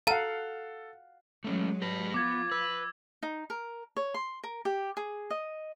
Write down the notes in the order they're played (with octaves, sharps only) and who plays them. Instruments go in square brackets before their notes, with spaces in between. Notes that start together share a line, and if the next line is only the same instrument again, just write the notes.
[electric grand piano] A4 [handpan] F5 F#5 [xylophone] A5 A#5
[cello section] F#3 G#3 [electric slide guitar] A3 C#4
[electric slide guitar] G4 B4 [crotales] A#6
[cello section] F3 F4 [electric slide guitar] B3 [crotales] D6 G#6 A6
[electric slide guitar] B4 [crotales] E6
[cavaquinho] D#4
A#4
C#5
C6
A#4
G4
G#4
D#5